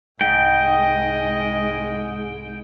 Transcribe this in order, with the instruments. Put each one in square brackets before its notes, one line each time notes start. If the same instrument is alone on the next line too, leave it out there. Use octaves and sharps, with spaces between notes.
[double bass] C2 G#3 [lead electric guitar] G#2 [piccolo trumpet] D#5 [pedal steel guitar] G5